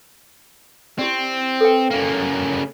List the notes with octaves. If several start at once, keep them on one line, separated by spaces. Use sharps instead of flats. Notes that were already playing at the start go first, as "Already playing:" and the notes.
C4 E4 G4 D5
A4 B4 G5
C#3 A#3